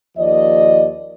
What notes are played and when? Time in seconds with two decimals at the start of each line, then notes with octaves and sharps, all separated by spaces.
0.18 D#2 F3 D5 D#5